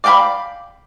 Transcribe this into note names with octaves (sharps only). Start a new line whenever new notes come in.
D5 F5 G5 A#5 B5